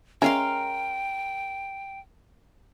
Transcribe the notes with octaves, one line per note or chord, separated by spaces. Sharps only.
G#3 C#4 A#4 E5 F5 G5 C6